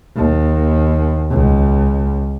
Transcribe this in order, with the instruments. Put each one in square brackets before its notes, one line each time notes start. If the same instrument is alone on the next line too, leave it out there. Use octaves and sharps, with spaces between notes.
[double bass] D#2
C#2